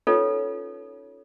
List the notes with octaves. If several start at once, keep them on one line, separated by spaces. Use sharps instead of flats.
C#4 D#4 F4 A4 B4 C#5